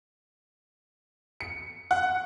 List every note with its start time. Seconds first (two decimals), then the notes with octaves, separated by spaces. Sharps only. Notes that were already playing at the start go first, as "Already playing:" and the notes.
1.41 C#7
1.91 F#5